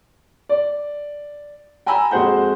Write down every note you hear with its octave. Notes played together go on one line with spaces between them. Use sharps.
D5
G5 G#5 A#5 B5 E6
F2 G#3 F#4 C5 F#5 G6